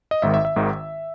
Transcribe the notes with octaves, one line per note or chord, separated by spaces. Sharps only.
D#5
G#1 G#2 D#3 E5
E5
E5
G#1 G#2 D#3